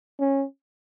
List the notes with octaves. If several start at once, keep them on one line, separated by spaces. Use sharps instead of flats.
C#4